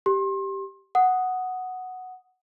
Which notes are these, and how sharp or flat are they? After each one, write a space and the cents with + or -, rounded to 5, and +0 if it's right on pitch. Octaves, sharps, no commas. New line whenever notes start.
G4 -5 C6 +35
F#5 +0 D#6 +0